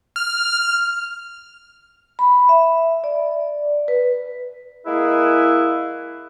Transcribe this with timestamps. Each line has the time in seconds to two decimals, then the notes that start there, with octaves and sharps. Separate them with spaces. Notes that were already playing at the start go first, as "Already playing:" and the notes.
0.16 F6
2.19 B5
2.49 E5
3.04 D5
3.88 B4
4.86 G#3 A#3 E4 G#4 B4 E5